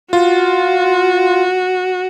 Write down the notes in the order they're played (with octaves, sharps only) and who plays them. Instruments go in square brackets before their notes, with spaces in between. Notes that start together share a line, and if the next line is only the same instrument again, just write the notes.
[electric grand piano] F4 [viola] F#4